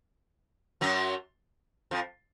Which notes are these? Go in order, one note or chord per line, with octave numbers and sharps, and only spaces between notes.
F#2 F#3
F2 F3